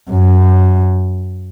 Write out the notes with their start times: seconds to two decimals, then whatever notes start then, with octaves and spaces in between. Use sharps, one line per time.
0.11 F#2